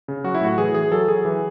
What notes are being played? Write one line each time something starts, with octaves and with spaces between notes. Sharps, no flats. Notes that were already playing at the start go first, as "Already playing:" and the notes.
C#3
F#3 F#4
E4
A2 F#4
E3 G#4
E3 G#4
F#3 A4
F#3 G#4
E3